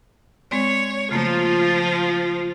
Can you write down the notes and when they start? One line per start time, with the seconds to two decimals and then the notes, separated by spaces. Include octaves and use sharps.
0.51 G#3 C4 C#5 D5
1.11 C#3 F3 A3 A#3 F4